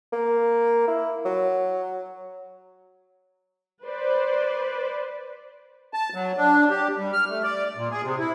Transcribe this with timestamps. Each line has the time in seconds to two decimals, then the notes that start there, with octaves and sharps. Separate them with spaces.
0.13 A#3
0.88 E4
1.25 F#3
3.83 B4 C5 D5
5.94 A5
6.14 F#3
6.37 D4
6.69 G4
6.98 G3
7.13 F6
7.29 A3
7.43 D5
7.76 A#2
7.91 G#4
8.03 C3
8.19 E4